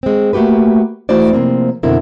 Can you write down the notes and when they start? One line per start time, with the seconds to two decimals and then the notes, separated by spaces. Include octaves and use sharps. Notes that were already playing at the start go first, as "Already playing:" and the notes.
0.03 G#3 C4
0.33 A3 A#3 F#4 G4 B4
1.09 E3 A3 E4 F#4 C5 D5
1.33 C3 F3 A#3 C4
1.83 F2 B2 D3 C4 E4 A#4